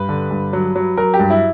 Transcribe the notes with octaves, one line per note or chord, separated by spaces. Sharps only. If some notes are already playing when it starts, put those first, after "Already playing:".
Already playing: G2 B4
D3
G2
F#3
F#3
F#3 A#4
G4
G2
E4